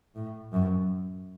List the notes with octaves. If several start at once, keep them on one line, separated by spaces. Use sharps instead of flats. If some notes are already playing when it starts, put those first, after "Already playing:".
A2
F#2